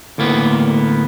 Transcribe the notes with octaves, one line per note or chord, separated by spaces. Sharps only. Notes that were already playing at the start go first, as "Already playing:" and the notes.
D2 A2 A#3 B3